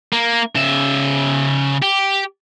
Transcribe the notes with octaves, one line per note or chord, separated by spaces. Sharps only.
A#3
C#3 E5
G4